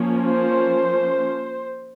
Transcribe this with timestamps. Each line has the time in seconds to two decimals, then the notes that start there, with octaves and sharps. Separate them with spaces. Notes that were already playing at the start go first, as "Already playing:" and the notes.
Already playing: F3 A#3 C#4
0.28 C5